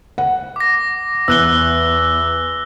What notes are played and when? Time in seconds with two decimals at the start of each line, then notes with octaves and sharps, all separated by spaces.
0.18 F#5
0.56 D6 A#6
1.28 E2 E6 F#6 G7